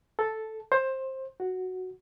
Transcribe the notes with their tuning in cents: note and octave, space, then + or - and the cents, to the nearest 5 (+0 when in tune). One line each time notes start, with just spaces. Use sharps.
A4 -5
C5 +15
F#4 +0